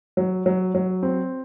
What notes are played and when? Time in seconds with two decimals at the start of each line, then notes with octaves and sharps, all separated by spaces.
0.17 F#3
0.46 F#3
0.75 F#3
1.03 C4